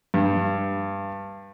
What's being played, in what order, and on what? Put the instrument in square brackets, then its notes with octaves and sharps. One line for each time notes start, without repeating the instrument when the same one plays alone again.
[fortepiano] G2